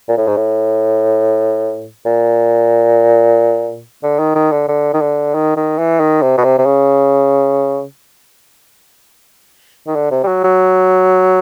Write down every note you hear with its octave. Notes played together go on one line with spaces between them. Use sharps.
A#2
A2
G#2
A2
A#2
D3
D#3
D#3
D3
D3
D#3
D3
D#3
D#3
E3
D#3
C3
B2
C3
C3
C#3
D#3
D3
C3
G3
F#3
F#3